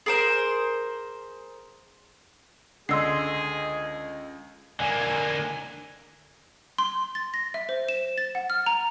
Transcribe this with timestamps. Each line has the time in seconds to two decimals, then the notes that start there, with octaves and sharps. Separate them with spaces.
0.06 G#4 A#4 C5
2.89 C#2 D3 G#4 D#5 C6 E6 C7
4.80 D3 A#3 G#5
6.78 C6
7.15 A6
7.34 A#6
7.54 E5
7.69 C5
7.89 E7
8.18 A6
8.35 F#5
8.50 F6
8.66 A#5